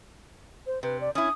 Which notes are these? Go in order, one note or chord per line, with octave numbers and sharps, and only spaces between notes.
C5
C3 B4
D5
C#4 E4 D#6